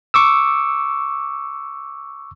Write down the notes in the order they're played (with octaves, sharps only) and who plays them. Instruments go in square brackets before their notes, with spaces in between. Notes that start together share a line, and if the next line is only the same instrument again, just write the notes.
[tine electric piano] C#6 D6 E6